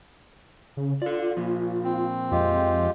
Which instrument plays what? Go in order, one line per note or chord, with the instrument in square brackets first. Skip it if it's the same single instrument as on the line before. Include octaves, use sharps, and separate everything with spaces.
[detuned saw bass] C#3
[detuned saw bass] F4 [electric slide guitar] A4 D5
[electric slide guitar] A#2 F3
[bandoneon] C4
[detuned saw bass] F2 [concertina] G#3 F4 G4